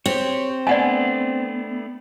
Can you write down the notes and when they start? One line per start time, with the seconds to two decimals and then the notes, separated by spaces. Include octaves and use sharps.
0.06 C4 G4 C#5
0.67 A3 B3 D4 D5 F#5 G#5